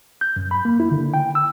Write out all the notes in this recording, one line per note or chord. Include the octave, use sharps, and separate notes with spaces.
G6
F#2
B5
A#3
E4
D3
G5
E6